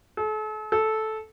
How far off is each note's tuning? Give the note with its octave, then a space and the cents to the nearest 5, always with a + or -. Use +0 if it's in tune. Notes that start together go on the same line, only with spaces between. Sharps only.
A4 -40
A4 -10